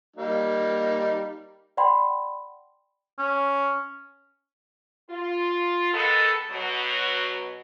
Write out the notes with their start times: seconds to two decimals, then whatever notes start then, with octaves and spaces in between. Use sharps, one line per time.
0.16 G3 A#3 D#4
1.77 D5 F#5 G5 B5 C6
3.19 C#4
5.10 F4
5.93 D#3 G#3 B3 A4
6.51 B2 F#3